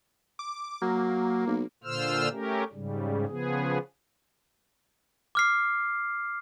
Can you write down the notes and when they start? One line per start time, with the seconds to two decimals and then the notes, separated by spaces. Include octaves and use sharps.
0.39 D6
0.82 F#3 A#3
1.47 B1
1.84 A#2 D3 F4 C5 E6 F6
2.31 A3 C#4 G4 A#4
2.73 G#2 C#3 G3
3.27 C#3 F3 B3 G#4
5.35 D6 F6 C7